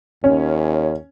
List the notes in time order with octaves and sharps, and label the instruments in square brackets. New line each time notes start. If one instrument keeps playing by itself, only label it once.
[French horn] D#2 [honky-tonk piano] C#4